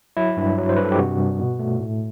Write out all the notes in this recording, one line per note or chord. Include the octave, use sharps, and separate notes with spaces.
F#3 E4
G2
F#3
C5
G2 B4
A4
G4
C3 F#4
G3
B2
A3
A2